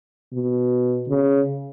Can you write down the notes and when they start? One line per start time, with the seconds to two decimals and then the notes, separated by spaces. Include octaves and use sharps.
0.33 B2
1.08 C#3